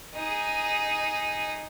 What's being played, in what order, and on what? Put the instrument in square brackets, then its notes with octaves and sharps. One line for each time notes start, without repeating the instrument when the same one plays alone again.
[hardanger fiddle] D#4 G#4